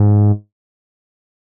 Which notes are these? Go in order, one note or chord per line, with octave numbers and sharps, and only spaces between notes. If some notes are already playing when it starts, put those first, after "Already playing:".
Already playing: G#2